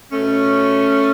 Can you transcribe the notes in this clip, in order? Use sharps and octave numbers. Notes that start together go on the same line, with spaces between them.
B2 A3 C#4
A2